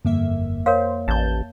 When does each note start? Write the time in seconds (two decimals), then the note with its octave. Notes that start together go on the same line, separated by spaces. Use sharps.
0.05 G1 F2 A#3 E5
0.66 A#4 C5 C#5 F5
1.08 A1 A5 G6